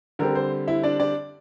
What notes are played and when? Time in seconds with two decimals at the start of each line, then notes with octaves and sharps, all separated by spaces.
0.19 D3 G3 C4 A#4
0.35 C5
0.67 E4 E5
0.83 D4 D5
1.00 D4 D5